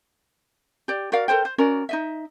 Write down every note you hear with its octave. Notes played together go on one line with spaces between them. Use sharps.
G4 D5
F#4 A#4 D5 F5
A4 A#4 C5 G5
C5
C#4 F#4 A#4 D5
D#4 D#5 E5